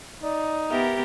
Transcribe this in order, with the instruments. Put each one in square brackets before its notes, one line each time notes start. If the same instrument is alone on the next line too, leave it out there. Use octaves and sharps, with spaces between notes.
[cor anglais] D#4 [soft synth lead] D5
[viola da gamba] B3 G4 A#4 [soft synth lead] E5